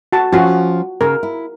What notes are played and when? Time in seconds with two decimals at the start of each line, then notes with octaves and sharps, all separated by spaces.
0.13 F#4 A5
0.32 F3 C#4 F4 F#4
1.01 C#3 A#4
1.23 E4